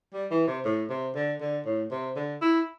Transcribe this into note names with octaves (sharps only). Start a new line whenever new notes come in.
G3
E3
C3
A2
C3
D3
D3
A2
C3
D3
E4